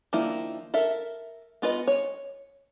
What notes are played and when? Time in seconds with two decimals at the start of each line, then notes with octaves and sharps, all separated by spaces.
0.13 D#3 F3 A#3 D4 E4
0.74 A4 A#4 E5
1.62 B3 F4 B4 D#5
1.87 C#5